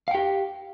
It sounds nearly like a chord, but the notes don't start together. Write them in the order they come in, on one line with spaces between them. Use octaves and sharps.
F5 G5 G4